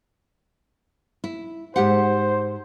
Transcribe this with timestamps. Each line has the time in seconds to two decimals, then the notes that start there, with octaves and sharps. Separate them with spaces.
1.24 E4
1.76 G#2 G4 C5 F#5